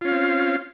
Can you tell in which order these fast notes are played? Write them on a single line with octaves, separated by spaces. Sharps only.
F4 C#4 F5 C4